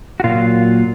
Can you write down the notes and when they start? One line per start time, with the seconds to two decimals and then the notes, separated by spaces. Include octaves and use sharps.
0.20 F#4
0.24 A#2 F#3 F4